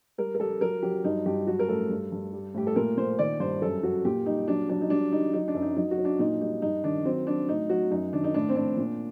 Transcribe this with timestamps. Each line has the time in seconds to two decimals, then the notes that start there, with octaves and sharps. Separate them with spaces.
0.18 G3 A#4
0.35 A#4
0.40 G3 A4
0.61 F#3 A#4
0.83 F#3 G4
1.04 G2 D#4
1.26 G2 G4
1.47 F#3 F#4
1.59 A#4
1.68 A2 A4
1.90 G2
2.12 G2
2.33 G3
2.54 A2 G4
2.67 A4
2.76 A#2 A#4
2.97 A#2 C5
3.19 D#3 D5
3.40 G2 C5
3.62 F#2 A4
3.83 F#3 F#4
4.05 A#2 G4
4.26 G3 D#4
4.48 F#3 D4
4.69 F#3 D4
4.81 D#4
4.90 G3 D4
5.12 G3 D#4
5.33 F#3 D#4
5.48 D4
5.55 F#2
5.62 D#4
5.76 F#3 D#4
5.91 F#4
5.98 F#3
6.05 D4
6.19 A#2 D#4
6.41 G3 D#4
6.62 G2 D#4
6.84 D#3 D4
7.05 F#3 C4
7.27 F#3 D4
7.49 A2 D#4
7.70 F#3 F#4
7.91 F#2 D#4
8.13 D#3 D4
8.24 D#4
8.34 A2 D4
8.49 C4
8.56 A2 D4
8.77 A#2